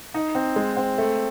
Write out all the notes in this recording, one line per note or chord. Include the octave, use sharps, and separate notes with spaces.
D#4
C4
G#3
C4
A3